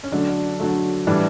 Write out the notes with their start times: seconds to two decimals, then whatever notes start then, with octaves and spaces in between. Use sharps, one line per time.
0.04 C#4
0.12 D3 F#3 A3 D4
0.60 D3 F#3 A3
1.07 A2 E3 G3 D4